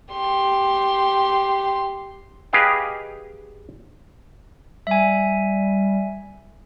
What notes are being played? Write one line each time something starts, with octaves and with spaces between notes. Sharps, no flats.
G4 C6
G4 G#4 B4 D#5 F5 G5
G3 E5 G#5